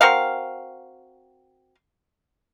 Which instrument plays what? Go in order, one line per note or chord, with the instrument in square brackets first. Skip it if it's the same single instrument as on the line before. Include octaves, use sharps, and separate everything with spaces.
[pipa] C4 F#4 A#4 F5